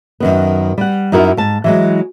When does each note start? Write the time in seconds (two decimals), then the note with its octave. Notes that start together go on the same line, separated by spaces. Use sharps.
0.20 F#2 D#3 B3
0.78 G3 F#5
1.12 F#2 D#4 E4 F#4 A#4
1.37 G#2 A5
1.64 E3 F#3 G#3